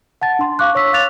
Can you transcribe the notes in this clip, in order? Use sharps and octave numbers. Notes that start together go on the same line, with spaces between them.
F#5 A5 A6
D4 C6
F5 C#6 D6 F#6
C#5 C#6 E6 B6
F5 D6 F#6 A6 F7